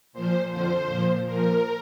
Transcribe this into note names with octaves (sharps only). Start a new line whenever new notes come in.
A#2 F3 C5
F2 D3 F3 C5
A#2 F3
A#2 F3 A#4